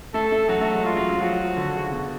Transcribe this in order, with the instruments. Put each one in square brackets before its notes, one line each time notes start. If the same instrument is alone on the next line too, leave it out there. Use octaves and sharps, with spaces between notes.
[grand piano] A3 [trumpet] A4
[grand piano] A3
[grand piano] F#3 [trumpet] F#4
[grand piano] A3
G#3
[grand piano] G#3 [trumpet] F4
[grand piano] F#3
F#3
[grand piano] F3 [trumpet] F#4
[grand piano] F3
D3
C#3
B2